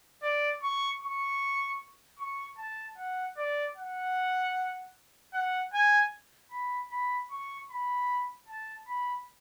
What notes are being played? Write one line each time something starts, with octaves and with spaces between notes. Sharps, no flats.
D5
C#6
C#6
C#6
A5
F#5
D5
F#5
F#5
G#5
B5
B5
C#6
B5
A5
B5